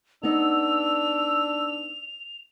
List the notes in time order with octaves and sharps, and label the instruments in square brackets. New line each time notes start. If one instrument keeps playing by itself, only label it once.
[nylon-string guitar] B3 D#4 D#5 [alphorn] D4 [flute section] E6 [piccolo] F7